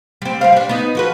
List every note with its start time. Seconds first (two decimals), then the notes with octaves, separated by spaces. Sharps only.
0.22 G3 C4
0.41 G3 C5 F5
0.52 G3 D4
0.69 B3 D#4
0.95 F3 F#4 B4